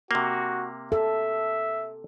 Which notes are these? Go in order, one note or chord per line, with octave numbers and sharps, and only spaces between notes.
C3 A#3 F#4
A4 E5